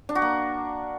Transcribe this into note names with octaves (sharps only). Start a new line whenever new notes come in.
D4
F#4
A#3